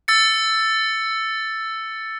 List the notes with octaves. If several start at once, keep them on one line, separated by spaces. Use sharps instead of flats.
E6 A6 C#7